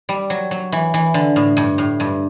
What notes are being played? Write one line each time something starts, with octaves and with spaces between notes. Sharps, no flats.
G3
F#3
F#3
E3
E3
D3
A2
G2
A2
G2